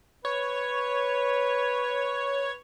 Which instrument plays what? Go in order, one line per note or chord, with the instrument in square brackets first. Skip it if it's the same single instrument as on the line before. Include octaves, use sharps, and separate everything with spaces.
[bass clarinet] B4 [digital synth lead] C#5